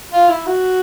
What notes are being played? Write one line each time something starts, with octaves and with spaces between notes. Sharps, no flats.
F4
E4
F#4